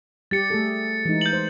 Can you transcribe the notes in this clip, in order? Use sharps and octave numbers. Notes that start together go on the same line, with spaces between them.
G3 G4 A6 C#7
A3 G#4 A4
E3 G#3 D#4
G6 F#7
C5